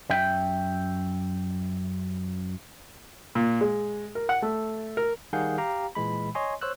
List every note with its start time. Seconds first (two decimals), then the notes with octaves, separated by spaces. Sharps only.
0.10 F#2 E5 G5
3.35 A#2
3.61 G#3
4.15 A#4
4.29 F#5
4.42 A3
4.97 A#4
5.33 D#3 G3 G#4 F5 F#5 G6
5.58 G4 F5 G5 A#5
5.95 A#2 E3 G#3 B5
6.35 C#5 D#5 G#5 C6
6.61 C5 C#5 E6 F#6